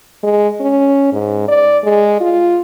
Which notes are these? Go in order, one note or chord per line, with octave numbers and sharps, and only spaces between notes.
G#3
C#4
G#2
D5
G#3
F4